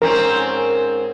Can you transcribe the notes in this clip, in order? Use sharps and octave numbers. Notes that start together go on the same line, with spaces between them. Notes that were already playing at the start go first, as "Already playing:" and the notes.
G#2 C4 C#4 A#4